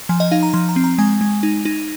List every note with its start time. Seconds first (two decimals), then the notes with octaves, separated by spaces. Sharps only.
0.09 F3 G#5
0.20 D#5
0.31 D#4 F5
0.43 A#5
0.54 F3 C6
0.69 A#5
0.76 C4
0.84 A#5
0.98 G#3 G#5
1.21 G#3
1.43 D#4
1.65 D#4